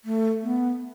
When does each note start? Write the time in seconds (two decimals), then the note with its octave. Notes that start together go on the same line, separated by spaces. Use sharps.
0.05 A3
0.42 B3